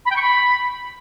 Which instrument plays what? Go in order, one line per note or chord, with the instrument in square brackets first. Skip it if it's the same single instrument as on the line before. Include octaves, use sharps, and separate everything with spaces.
[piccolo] B5
G5
C#6
B5